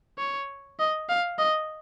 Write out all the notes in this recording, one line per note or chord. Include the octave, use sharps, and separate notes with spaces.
C#5
D#5
F5
D#5